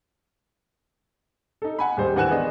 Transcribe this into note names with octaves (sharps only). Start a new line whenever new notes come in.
D#4 A4
F#5 G#5 B5
D#1 G3 G#3 C5
D#2 E3 F#5 G#5 F#6 E7
B3 D4 G#4 D#5